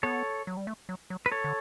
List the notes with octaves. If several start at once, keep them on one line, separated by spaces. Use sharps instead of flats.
B3 A4 C#5
F#3
G3
A3
F#3
F#3
B4
A4 C#5
D3